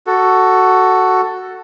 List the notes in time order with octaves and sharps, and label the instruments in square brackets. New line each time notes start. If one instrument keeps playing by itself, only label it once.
[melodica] F#4 A4